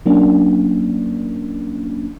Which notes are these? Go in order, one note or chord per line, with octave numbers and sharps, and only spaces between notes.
F#3 A#3 C#4 D4